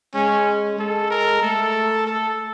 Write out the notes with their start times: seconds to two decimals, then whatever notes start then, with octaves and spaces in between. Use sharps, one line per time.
0.14 G#3 C#4
0.79 G#3 A4
1.10 A#4
1.42 A3 A4
2.06 A4